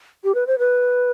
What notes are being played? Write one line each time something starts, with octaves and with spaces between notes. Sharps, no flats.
G4
B4
C5
B4